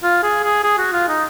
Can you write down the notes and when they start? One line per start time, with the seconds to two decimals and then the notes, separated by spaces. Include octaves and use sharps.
0.03 F4
0.23 G#4
0.44 G#4
0.64 G#4
0.78 F#4
0.93 F4
1.08 D#4